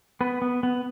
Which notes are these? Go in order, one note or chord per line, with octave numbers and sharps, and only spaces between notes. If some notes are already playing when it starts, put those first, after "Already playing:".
B3 B4
B3
B3